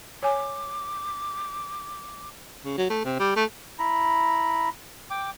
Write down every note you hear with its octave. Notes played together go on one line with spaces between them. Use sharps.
C#5 G#5 D6
C#3
F#3
A3
C3
G3
A3
E4 A#5 B5
G5 D6